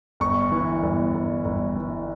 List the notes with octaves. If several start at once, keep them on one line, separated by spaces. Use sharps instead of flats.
G1 C#6
E3
G1
G1
G1
E3